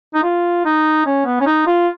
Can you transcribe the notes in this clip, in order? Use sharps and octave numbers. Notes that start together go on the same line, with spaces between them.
D#4
F4
D#4
C#4
B3
C#4
D#4
F4